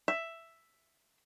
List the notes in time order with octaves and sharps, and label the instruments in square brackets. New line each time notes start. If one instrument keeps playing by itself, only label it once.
[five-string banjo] E5